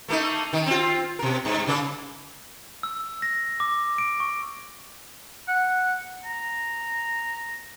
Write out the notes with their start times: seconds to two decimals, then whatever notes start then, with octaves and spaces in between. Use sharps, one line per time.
0.08 A3 A#3 D#4
0.53 D#3
0.66 C4 F4
1.19 B2 A#4
1.45 G2
1.67 C#3 A#3
2.83 E6
3.22 A#6
3.60 D6
3.98 D7
4.20 C#6
5.48 F#5
6.25 A#5